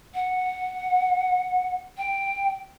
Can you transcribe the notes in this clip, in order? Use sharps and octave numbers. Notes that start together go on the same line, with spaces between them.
F#5
G5